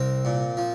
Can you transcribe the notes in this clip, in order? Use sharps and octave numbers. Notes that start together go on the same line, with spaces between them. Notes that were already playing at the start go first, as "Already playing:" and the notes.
Already playing: C2 C4 A#4
A#2
F3